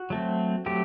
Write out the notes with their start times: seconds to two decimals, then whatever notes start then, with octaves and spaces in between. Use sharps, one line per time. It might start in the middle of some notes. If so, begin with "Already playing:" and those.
Already playing: F#4
0.10 F#3 A3 C4
0.66 F#3 A3 C4 G4